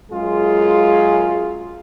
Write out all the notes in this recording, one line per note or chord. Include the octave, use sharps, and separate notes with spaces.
F#2 G#3 F4 G#4